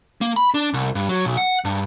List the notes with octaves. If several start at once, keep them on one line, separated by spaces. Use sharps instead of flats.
A#3
B5
D4
C2
G2
F#3
B1
F#5
G2